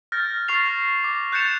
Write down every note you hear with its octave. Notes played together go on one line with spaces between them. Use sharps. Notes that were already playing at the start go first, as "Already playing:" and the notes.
F6 G6 A6 A#6
C#6 F6 A6 C7 F7
D6
F#6 G6 A6 C#7 E7 F7